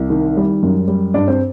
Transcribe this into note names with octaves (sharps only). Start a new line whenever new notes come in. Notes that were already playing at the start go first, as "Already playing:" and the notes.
Already playing: C2
D#3
G3
F#2
G3
G2 D4 D5
C4 C5